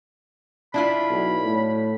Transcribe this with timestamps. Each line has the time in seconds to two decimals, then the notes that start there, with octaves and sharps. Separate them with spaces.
0.74 D4 E4 F4 B5
1.10 B1
1.43 A2